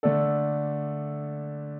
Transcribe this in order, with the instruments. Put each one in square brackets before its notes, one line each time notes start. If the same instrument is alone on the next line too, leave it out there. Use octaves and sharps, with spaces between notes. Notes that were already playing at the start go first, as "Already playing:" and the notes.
[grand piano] D3 A3 D4 A4